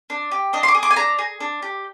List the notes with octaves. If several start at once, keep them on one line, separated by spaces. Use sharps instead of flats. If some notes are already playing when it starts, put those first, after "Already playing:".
D4
G4
D4 D#5
C6
D6
G#4
D6
G#5
D4 A#5
G#4
D4
G4